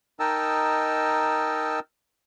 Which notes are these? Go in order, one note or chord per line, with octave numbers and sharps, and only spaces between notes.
D#4 A#4 D#5 G5 A5 E6